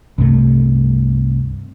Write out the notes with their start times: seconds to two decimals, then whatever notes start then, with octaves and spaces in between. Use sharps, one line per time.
0.18 C2 G2 C3 A3